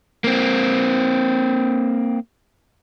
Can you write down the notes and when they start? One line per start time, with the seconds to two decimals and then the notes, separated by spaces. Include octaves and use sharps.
0.24 A#3 C4